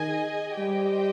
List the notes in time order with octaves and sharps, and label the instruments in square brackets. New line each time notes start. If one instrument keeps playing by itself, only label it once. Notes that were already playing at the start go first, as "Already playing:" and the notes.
Already playing: [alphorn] D#3 [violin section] G#4 D#5 G#5
[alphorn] G3 [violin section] G4 C5 D#5 G5